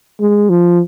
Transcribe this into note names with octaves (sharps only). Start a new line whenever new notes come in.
G#3
F3